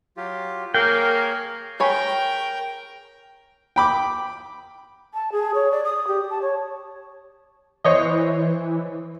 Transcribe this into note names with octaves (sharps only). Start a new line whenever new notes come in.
F#3 F4 G4
A#3 G#4 A#4 C#5 G5
G#4 A#4 C#5 G5 B5
G5 B5 D6
A5
G#4
C#5
D5
D#6
G4
A5
C#5
E3 C5 C#5 D#5